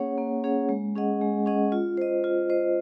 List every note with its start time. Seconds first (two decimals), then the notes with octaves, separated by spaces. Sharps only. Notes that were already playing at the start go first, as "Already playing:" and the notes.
Already playing: A#3 C#4 G#4 C#5 F#5
0.18 A#3
0.44 C#4 G#4 C#5 F#5
0.69 G#3
0.95 C#4 G#4 D#5 F#5
1.21 G#3
1.46 C#4 G#4 D#5 F#5
1.72 F4
1.97 C5 D#5
2.24 F4
2.50 C5 D#5